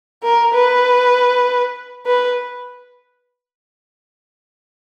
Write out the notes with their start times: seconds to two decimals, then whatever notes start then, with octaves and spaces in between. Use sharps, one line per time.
0.23 A#4
0.54 B4
2.06 B4